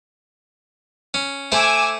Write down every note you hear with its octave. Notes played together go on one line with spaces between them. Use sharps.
C#4
A3 C5 G#5 D6 E6